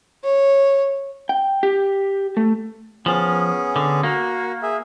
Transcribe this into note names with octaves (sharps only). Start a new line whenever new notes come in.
C#5
G5
G4
A3
F3 B3 C#4 G#4
D3
A#3 F#4
G#4 E5